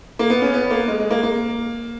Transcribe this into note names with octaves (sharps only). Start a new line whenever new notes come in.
A#3
B3
C#4
B3
A#3
G#3
G#3
A#3
A#3